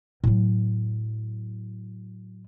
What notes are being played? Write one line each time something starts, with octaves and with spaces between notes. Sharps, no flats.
A2 F#3